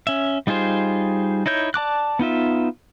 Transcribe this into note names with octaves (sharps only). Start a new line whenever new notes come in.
C#4 E5
G3 D#4 F4 G#4 C5
D#4 E4 C#5 G6
D5 A5 D6 F#6
B3 D#4 F4 E5